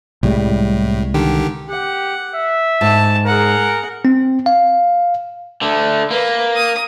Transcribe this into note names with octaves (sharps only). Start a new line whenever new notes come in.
C2 A2 G3 G#3
D3 D#3 G4
G4 F#5
E5
G#2 A5
G#4 A#4 F#5
C4
F5
D3 A3
A#3 B4
D#6